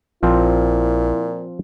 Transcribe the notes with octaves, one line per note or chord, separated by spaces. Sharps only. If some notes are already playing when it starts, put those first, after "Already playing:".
A#1 A#2 F3 C4 E4